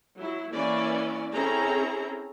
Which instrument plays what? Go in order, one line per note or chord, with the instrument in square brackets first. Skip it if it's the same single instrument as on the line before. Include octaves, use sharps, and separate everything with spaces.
[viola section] F#3 E4
E3 A#3 C#4 E4 B4 D5
C4 C#4 E4 G#4 A4 A#5